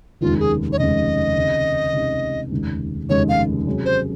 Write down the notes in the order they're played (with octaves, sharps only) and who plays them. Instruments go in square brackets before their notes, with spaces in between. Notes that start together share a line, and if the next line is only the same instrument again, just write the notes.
[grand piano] F1 D#2 C#3 G#3 [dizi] F4
[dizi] G#4
C#5
[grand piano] F1 D#2 C#3 G#3 [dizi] D#5
[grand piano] C#2 C3 D#3
C#2 C3 D#3
F1 D#2 C#3 G#3
[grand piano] F1 D#2 C#3 G#3 [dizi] C#5
[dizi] F5
[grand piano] C3 F#3 C#4 G#4
[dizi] C5